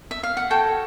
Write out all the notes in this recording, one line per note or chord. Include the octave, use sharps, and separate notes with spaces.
E5
F5
F#5
F#4 A4 C#5 G5